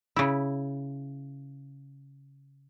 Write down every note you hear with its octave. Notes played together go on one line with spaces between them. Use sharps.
C#3 E4